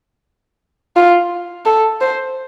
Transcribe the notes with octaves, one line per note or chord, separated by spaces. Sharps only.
F4
A4
C5